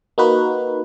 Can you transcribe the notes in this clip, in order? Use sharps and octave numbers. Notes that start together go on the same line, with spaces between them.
A#3 D#4 F#4 B4